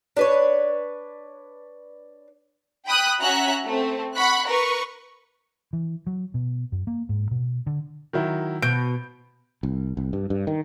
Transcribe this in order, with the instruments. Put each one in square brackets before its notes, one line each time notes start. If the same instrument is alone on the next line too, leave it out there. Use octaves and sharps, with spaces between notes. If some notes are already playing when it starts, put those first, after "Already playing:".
[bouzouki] D4 B4 C#5
[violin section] G5 B5 D#6 F#6
C#4 F#4 E5 A#5 F#6
A3 C4
F#5 B5 C#6 F#6
A#4 B4 C#6
[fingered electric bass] E3
F#3
B2
F#2
A#3
G#2
B2
D3
[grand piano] D#3 F#3 E4
[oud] B2 [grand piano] G6 D7
[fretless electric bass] C2
C2
G2
G2
D#3